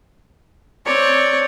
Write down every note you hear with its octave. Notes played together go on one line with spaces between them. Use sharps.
C4 C#5 D5